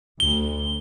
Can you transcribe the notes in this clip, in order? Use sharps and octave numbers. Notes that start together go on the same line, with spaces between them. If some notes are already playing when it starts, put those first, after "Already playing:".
D2 G7